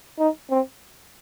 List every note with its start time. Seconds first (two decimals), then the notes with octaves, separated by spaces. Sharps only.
0.19 D#4
0.51 C4